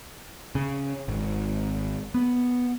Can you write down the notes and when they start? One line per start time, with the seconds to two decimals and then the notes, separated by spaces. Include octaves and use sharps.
0.55 C#3
1.08 G#1
2.14 B3